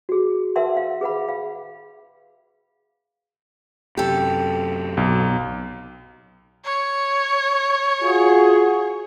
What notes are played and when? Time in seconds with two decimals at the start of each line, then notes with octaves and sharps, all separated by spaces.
0.09 F#4 G#4
0.56 A#4 B4 E5 F#5 A5 C6
0.77 F5
1.01 G#4 B4 F#5 B5
1.29 F5
3.97 F#2 C3 G4 A4
4.97 B1
6.64 C#5
8.02 F4 F#4 G#4